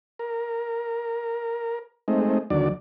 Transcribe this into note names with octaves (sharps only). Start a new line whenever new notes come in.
A#4
G#3 A3 C4 D#4
D#2 D3 F#3 D5